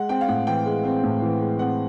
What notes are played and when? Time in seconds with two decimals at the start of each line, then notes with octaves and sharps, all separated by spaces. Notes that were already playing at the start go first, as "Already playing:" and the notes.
Already playing: G#3 F#5
0.09 C4 G5
0.21 F5
0.28 A2 F#5
0.47 E3 G5
0.66 G#3
0.85 C4
1.03 A2
1.22 E3
1.41 G#3
1.59 C4 F#5